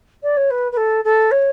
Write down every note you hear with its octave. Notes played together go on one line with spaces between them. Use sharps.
D5
C#5
B4
B4
A4
A4
C#5